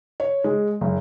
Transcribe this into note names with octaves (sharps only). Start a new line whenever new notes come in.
C#5
G#3
F#1